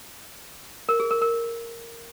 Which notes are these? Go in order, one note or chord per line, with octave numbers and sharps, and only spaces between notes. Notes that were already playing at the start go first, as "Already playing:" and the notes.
A#4
G#4
A#4
A#4